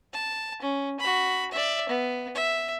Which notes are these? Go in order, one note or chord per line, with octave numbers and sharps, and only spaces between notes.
A5
C#4
F#4 B5
D5 E5
B3
E5